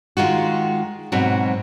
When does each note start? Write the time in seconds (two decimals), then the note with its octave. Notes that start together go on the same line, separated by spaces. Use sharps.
0.17 D#3 G#3 F4 F#4
1.12 G#2 B2 F#3 C4 F#4